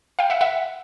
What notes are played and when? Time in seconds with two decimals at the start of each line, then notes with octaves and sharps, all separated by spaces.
0.19 F5 G5
0.30 E5 F#5
0.41 E5 F#5